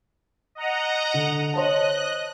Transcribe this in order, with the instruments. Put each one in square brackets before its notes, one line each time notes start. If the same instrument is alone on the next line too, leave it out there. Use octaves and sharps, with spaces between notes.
[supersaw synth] D#5 F#5 A#5
[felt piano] D3
[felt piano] C5 C#5 A5 [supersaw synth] D#5 F#6